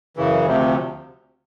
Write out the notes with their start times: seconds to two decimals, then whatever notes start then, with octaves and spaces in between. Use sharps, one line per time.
0.17 F#2 C#3 E3
0.46 D2 C3 F3